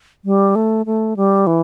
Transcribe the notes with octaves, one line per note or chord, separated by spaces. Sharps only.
G3
A3
A3
G3
E3